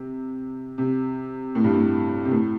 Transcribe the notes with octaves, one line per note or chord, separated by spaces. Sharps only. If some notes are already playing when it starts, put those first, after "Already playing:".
Already playing: C3
C3
A2
G2
A2
C3
A2